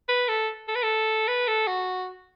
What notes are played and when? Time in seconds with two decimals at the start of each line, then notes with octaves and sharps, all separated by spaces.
0.09 B4
0.28 A4
0.68 A4
0.75 B4
0.83 A4
1.28 B4
1.48 A4
1.67 F#4